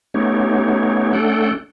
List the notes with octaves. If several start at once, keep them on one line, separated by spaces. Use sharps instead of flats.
A3 B3 C#4 D#4 G4 C#5
A3 C#4 D4 A4 F#5 G5